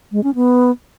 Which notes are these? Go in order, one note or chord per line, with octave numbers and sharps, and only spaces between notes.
G#3
C#4
B3